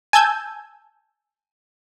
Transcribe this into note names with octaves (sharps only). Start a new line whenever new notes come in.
G#5 A5 E6 G6 G#6